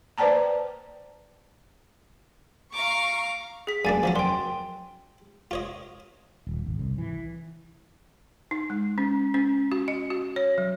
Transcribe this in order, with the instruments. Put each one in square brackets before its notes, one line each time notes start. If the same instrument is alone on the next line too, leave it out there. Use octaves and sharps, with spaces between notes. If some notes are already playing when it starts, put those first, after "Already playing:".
[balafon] B4 C5 D5 G5 A5 A#5
[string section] F5 A#5 C#6 [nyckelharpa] D6
[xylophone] G#4 B6
[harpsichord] F#2 A#3 D4 [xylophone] G#5 A6
[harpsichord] F3 F#3 C#4
[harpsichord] F#2 [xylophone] G5 C6
[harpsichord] F4 C#5 D#5
[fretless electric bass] D#1
G#1
C2
E3
[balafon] D#4
G#3
C#4
C#4
F#4
D#5
F#4
C#5
F#3